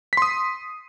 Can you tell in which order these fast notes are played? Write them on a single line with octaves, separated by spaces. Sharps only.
B6 C6 D#6